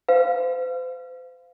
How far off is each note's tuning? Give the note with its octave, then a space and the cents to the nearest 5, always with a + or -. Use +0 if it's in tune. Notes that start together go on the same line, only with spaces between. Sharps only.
C5 -40 F5 +0